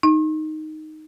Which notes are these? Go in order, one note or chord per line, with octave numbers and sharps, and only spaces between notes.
D#4